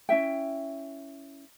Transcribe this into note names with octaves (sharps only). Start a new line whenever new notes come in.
C#4 E4 E5 G5